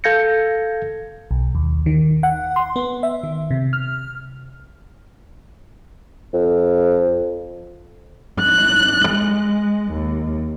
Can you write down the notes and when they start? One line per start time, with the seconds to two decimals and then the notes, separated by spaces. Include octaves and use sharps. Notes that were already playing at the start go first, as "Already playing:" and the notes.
0.04 A4 F5 G6 G#6 A#6 C#7
1.31 B1
1.55 D#2
1.86 D#3
2.23 F#5
2.56 C6
2.76 B3
3.03 E5
3.23 D#3
3.51 C3
3.73 F6
6.33 F2
8.41 F#6
9.09 G#3
9.91 D#2